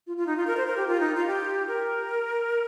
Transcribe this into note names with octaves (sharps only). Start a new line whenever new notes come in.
F4
F4
D#4
F4
A#4
C5
A#4
G4
F4
D#4
F4
G4
A#4